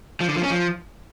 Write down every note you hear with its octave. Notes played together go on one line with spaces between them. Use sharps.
F3
D3
F3
C#4
F3